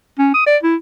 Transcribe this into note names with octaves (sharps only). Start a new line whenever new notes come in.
C#4
D#6
D5
E4